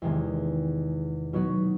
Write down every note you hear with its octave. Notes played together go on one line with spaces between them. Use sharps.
E2 C3 D#3 G#3
B2 F#3 B3 D#4 F#4